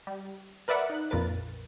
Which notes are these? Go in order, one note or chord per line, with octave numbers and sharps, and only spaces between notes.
G3
A#4 B4 D5 E5 F#5
D#4 F#6
A#1 F2 A#2 A#4 B4 A6